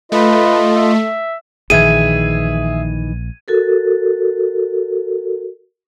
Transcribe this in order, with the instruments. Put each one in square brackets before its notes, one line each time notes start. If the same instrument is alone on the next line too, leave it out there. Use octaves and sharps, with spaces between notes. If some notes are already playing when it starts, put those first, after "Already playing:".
[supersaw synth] A3 [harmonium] F4 D#5 [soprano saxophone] B4
[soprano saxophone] E5
[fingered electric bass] A#1 [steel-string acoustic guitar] D#3 E3 [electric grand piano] G#4 E5 [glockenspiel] G#6 D#7
[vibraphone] F#4 A4 A#4